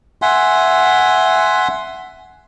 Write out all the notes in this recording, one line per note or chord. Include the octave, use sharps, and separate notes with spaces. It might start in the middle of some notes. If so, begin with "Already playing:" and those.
E5 F#5 G#5 C6